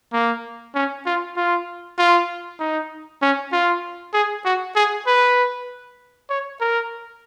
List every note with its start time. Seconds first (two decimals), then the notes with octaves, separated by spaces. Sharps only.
0.13 A#3
0.75 C#4
1.06 F4
1.36 F4
1.98 F4
2.59 D#4
3.22 C#4
3.52 F4
4.14 G#4
4.45 F#4
4.76 G#4
5.07 B4
6.30 C#5
6.61 A#4